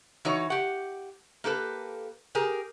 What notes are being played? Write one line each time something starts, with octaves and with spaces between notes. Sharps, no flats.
E3 D#4 F#4 C#5
G4 F#5
A#3 G4 A4 B4
G4 G#4 A#4